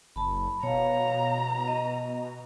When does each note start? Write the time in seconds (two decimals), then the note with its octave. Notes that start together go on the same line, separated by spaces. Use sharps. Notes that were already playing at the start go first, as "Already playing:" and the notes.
0.16 F#1 A5 B5
0.63 B2 C#5 F5 A#5
1.68 D#5